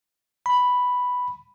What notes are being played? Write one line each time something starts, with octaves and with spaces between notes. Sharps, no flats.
B5